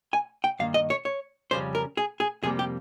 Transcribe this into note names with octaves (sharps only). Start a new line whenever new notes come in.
G#5
G5
G2 D#3 A#3 F5
D#5
C#5
C#5
F2 C#3 G3 C#4 C5
A#4
G#4
G#4
F2 C3 G3 A#3 G#4
G4